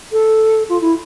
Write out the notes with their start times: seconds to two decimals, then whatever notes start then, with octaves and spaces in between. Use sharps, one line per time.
0.12 A4
0.69 F4
0.81 E4